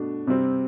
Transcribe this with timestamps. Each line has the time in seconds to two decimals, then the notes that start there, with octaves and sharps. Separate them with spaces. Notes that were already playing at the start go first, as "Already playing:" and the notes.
Already playing: B2 A3 D4
0.27 C3 G3 C4